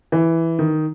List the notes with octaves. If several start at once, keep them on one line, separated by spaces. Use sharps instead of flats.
E3
D#3